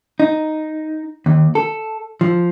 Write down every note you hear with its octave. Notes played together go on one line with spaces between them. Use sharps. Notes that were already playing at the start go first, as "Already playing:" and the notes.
D#4
D#2
A4
F3